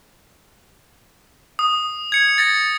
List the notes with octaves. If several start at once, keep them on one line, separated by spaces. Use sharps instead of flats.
D#6
G#6 C#7
A6 A#6 C#7